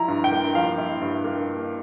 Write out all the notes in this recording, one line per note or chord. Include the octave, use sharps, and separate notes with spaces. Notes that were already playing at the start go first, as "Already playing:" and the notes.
Already playing: F3 E4 A#5
G2
G5
A#3
F3 F5
E4
G2
A#3